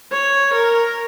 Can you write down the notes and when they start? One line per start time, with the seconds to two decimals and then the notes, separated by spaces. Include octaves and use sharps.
0.12 C#5
0.53 A#4